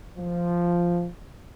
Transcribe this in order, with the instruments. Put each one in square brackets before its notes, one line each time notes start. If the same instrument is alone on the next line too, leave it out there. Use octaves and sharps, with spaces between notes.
[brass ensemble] F3